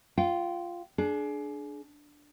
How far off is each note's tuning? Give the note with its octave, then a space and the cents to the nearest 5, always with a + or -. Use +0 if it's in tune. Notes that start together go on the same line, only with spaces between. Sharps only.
F4 -5 G5 -25
D4 +0 G#4 +30